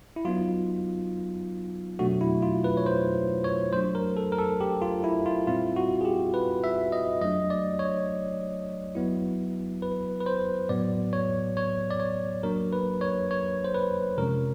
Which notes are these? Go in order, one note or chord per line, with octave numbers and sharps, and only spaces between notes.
E4
F#3 B3 D#4 F4
B2 F#3 A3 D4 F#4
E4
F4
B4
C#5
C5
C#5
F#3 A3 D4 C5
A#4
A4
A#4
A4
G4
F4
E4
F4
A#2 G3 C4 E4 F4
F#4
G#4
G4
B4
E5
D#5
F#3 A3 D4 D#5
D5
C#5
F#3 B3 E4
B4
B4
C5
A2 F#3 B3 D5
C#5
C#5
D5
C#5
F#3 A#3 D4 A#4
B4
C#5
C#5
C5
B4
C3 F3 G#3 C#4 A#4